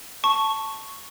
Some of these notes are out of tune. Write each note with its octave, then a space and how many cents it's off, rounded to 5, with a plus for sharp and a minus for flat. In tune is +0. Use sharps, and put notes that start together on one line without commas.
A5 +0 C#6 +0